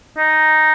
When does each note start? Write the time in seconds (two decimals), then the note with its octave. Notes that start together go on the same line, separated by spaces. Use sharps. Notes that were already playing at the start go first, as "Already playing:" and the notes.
0.18 D#4